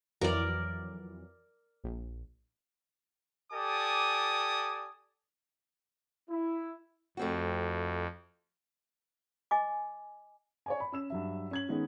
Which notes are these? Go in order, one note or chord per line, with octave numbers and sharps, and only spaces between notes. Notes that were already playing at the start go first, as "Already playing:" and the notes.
F2 E3 F#3 A#4 D5
A#1
G4 A4 D5 G#5 D6 D#6
E4
F2 A3 C4 F#4
D#5 G#5 D6
C#5 D5 G#5
B5
C#4 E6 E7
G2 F#3 E5
C#4 G#6 F#7
D#3 G#3 B3 C#4 D#4